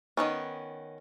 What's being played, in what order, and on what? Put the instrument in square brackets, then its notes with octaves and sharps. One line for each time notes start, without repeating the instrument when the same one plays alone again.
[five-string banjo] D#3 F3 B3 C#4